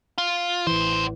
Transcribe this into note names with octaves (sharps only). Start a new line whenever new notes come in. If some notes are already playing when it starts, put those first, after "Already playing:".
F4
A1 E2 E3 C5